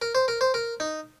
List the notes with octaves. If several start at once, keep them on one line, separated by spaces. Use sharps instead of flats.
A#4
C5
A#4
C5
A#4
D#4